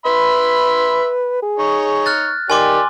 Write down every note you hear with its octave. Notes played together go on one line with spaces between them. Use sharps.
B4 E5 B5 C6
G#4
D#4 C#5 C#6
F6 F#6 A6
D#3 G4 D5 G#5 C6 D6